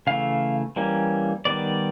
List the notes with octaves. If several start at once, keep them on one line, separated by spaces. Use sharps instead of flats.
C#3 E3 A3 F5
E3 G3 A#3 C#4
D#3 G3 B3 D5